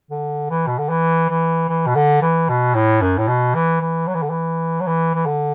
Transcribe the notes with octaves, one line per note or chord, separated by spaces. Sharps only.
D3
E3
B2
D3
E3
E3
E3
B2
D3
E3
B2
A2
F#2
A2
B2
E3
E3
F#3
E3
D3
E3
F#3
E3
E3
D3